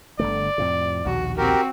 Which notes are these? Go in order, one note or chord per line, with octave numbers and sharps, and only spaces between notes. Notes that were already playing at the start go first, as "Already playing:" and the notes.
G1 D3 A3 D5
F2 A2 C3
A#1 D#2 B2 F#4
C4 F#4 G4 A#4